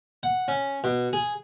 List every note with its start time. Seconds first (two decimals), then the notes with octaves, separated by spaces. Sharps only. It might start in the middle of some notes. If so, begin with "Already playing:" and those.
0.23 F#5
0.48 C#4
0.84 B2
1.13 G#4